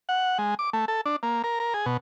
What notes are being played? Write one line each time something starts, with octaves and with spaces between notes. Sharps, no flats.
F#5
G#3
D6
A3
A4
D4
A#3
A#4
A#4
G#4
B2